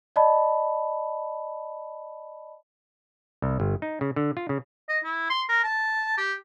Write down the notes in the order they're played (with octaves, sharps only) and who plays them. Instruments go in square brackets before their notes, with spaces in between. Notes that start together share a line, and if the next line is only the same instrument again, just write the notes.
[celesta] D5 D#5 A5 B5
[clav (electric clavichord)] C2
G1
D#4
C#3
D3
F4
C#3
[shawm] D#5
E4
C6
A#4
A5
G4